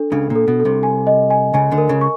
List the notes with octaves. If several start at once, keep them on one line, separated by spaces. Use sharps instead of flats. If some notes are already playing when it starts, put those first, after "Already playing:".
Already playing: D4 A4
C#2 C#3 D4
A#2
A4
B2
A4
C2 C3
G#5
D#5
G#5
C#2 C#3 G#5
D2 D3
A#4
C#2 C#3
C#6